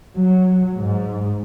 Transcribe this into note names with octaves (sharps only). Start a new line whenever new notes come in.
F#3
G#2